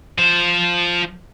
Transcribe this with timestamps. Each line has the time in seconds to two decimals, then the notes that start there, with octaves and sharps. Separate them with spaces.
0.18 F3 C5